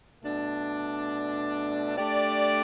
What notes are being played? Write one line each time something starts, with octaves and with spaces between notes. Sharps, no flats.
B2 A3 D4
A3 D4 G4 D5